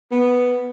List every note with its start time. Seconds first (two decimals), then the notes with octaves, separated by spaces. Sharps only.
0.11 B3